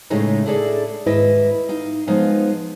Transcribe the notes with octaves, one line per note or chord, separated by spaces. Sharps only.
A2 C#3 G#3 A3 D#4 E4
D4 E4 G#4 A4 C#5 D5
D#2 G#2 E4 B4 D#5
D#4 F5
F3 G#3 B3 D#4 F5